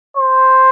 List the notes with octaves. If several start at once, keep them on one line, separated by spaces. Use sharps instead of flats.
C5